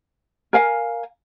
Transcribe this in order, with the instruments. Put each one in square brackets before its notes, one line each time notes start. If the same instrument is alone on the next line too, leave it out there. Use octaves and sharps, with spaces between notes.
[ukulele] A#4 F5 G#5